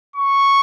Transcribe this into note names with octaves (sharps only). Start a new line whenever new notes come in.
C#6